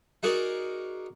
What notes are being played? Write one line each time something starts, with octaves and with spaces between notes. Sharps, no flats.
D#4 F#4 G#4 A#4 D5